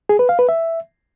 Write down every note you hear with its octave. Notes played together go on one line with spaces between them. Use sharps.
G#4
B4
F5
B4
E5